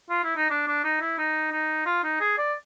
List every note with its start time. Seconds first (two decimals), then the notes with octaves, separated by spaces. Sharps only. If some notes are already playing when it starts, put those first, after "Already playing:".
0.10 F4
0.24 E4
0.36 D#4
0.50 D4
0.68 D4
0.84 D#4
1.01 E4
1.18 D#4
1.52 D#4
1.86 F4
2.04 D#4
2.20 G#4
2.38 D5